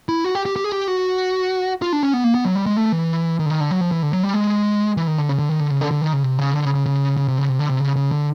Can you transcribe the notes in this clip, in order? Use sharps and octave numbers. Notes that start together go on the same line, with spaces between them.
E4
F#4
G4
G4
G4
G#4
G4
F#4
F4
D4
C#4
B3
A#3
B3
F#3
G3
G#3
A3
E3
D#3
D3
D#3
D3
F#3
F3
E3
D3
F#3
G3
G#3
E3
D#3
D3
C#3
D3
D#3
D3
C#3
D3
D3
D#3
C#3
C3
C#3
D3
C#3
C#3
C#3
C#3
C3
C#3
C3
D3
C3
C#3
C#3
D3